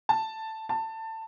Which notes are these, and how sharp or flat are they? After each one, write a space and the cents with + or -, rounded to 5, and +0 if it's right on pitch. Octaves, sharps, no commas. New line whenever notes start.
A5 +5
A5 +20